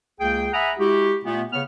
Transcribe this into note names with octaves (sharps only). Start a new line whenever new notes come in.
C#2 A#3 G#4 G5
E5 F#5 G#5 A#5 B5 D#6
G#3 E4 F#4 G4
A#2 A3 B3
C#3 B3 C#5 F6